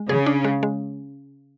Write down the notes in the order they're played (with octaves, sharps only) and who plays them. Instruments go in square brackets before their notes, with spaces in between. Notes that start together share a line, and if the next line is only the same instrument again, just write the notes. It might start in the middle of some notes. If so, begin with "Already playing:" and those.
Already playing: [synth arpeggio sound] G#3
[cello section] C#3 [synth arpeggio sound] G#4
[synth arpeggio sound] D4
G#3
G#3